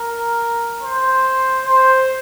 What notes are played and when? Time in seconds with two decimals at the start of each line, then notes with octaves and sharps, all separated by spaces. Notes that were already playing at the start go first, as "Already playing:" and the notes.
Already playing: A#4
0.81 C5
1.65 C5